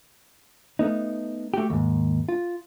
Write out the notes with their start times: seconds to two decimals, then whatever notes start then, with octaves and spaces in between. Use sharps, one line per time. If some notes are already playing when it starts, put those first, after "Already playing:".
0.79 A3 B3 D#4
1.54 A3 F#4 G4
1.70 D#2 G#2
2.29 F4